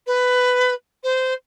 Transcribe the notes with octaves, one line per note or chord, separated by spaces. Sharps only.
B4
C5